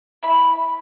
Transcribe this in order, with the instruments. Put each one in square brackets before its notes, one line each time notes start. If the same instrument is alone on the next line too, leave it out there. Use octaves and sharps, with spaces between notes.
[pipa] E4 B5